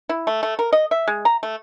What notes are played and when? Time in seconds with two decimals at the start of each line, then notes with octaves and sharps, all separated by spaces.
0.09 E4
0.27 A3
0.43 A3
0.59 A#4
0.73 D#5
0.91 E5
1.08 G#3
1.25 A#5
1.43 A3